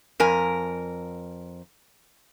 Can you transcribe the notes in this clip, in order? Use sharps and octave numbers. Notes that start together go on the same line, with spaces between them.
F2 A#4 G#5